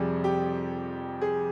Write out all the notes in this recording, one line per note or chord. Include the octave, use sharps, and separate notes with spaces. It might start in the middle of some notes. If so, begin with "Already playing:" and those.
Already playing: F2 C3 G3 G#4
G4
G#4